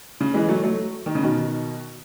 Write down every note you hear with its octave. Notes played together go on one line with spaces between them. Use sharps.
C#3
E3 G#3
F#3 A3
F#3 A3
D#3
C#3
B2 D#3